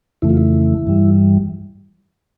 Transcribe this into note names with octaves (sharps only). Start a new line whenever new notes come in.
F2 C#3 E3 A3 E4
F4
E4
G2 E3 G3